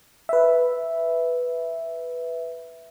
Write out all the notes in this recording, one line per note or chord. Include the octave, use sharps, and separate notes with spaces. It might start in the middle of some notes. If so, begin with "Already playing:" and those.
B4 E5